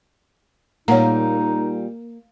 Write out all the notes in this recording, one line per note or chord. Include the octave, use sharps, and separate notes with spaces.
A#2 G3 A#3 D#4 C#5 F#5 A#5